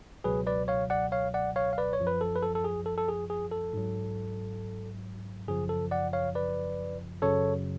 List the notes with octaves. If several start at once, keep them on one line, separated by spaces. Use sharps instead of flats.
C#2 B2 F#3 G#4 B4
B4 D5
C#5 F5
D5 F#5
C#5 F5
D5 F#5
C#5 F5
F5
B4 D5
C#5
F#2 F3
B4
A4
B4
A4
A4
G#4
A4
A4
G#4
G#4
A4
G#2 F#3
F#2 C#3 F3 G#4
A4
D5 F#5
C#5 F5
B4 D5
F#2 C#3 F#3 A4 C#5